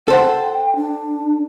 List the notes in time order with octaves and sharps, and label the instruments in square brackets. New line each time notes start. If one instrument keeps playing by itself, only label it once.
[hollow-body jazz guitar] A4 C5 F#5 [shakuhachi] G5
[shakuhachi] D4